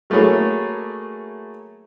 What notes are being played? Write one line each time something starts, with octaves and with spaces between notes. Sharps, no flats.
F#3 A3 A#3 E4 G#4 C#5